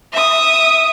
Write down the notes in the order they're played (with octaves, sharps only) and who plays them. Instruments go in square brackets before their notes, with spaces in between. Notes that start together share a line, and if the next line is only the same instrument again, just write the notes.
[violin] E5 D#6